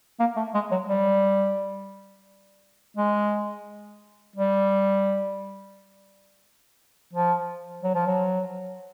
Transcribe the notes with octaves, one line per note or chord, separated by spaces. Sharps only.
A#3
A3
G#3
F#3
G3
G#3
G3
F3
F#3
F3
F#3